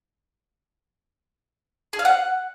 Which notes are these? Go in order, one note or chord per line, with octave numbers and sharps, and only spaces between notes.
G#4
F5
F#5